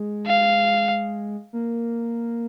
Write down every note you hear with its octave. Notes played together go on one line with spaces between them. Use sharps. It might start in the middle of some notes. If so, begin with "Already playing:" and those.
Already playing: G#3
F5
A#3